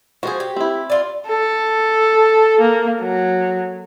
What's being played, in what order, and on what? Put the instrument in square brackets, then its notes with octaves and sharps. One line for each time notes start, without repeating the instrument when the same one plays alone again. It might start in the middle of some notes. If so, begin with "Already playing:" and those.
[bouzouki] F3 G#4 [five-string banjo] F#4 C5
[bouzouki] G4
[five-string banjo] C4 E4
[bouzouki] F4 D5
[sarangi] A4
A#3
F#3